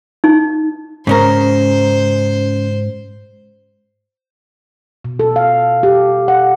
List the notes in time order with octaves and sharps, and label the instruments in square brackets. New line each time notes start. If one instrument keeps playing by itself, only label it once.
[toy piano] D#4
[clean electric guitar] G#2 [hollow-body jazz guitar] C#3 C#4 A#4 [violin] C5
[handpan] B2
A4
F5
G4
F#5